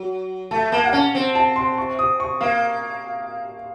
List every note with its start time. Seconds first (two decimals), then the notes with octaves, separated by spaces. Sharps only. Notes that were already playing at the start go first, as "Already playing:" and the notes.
Already playing: F#3
0.51 A3 A5
0.72 A#3 A5
0.84 F#5
0.93 C#4 A5
1.15 C4
1.35 A5
1.56 C6
1.78 C#6
1.99 D#6
2.20 C#6
2.41 A#3 F5